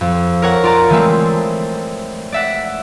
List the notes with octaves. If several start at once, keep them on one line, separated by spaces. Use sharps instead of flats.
F2
A#4 C#5 F#5
F4 D5 A#5
E3 G#3 A3 C4
D5 E5 F#5